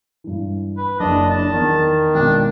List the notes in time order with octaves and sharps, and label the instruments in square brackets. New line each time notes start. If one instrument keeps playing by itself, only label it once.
[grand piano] G2 E3
[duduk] B4
[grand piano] F#1 [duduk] D4 [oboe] D#5
[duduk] D4 [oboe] A5
[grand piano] E2 [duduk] D#3
[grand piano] G#1 B2 G5 [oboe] D4